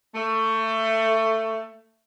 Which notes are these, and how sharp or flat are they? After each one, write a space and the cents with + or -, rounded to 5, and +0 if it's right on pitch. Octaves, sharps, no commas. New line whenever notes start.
A3 +20